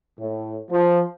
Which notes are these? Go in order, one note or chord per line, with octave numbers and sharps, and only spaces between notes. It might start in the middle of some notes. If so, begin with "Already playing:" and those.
A2
F3